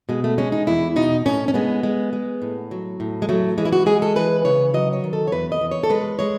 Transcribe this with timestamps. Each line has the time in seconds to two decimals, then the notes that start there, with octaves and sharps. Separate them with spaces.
0.09 B2 G#3
0.24 A3
0.38 G#3 C#4
0.52 D#4
0.67 E2 E4
0.96 B2 D#4
1.26 A2 C#4
1.48 C#4
1.54 G#3 B3
1.83 G#3
2.13 G#3
2.42 A2
2.71 F#3
3.00 A2
3.22 G#3
3.29 F#3 A3
3.58 E3 G#3
3.65 E4
3.73 F#4
3.86 G#3 G#4
4.02 A4
4.16 E3 B4
4.45 C#3 C#5
4.74 F#3 D#5
4.93 C#5
5.04 D#3
5.13 A4
5.27 C#5
5.32 E2 B4
5.52 D#5
5.61 E2
5.71 C#5
5.83 A4
5.90 G#3 B4
6.19 G#3 C#5